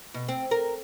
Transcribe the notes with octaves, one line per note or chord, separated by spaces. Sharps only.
B2
C4
A#4